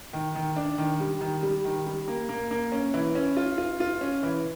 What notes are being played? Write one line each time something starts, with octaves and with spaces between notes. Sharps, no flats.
D#3
D#3
D4
D#3
G3
D#3
G3
D#3
G3
A#3
A#3
A#3
C#4
E3
C#4
F4
F4
F4
C#4
E3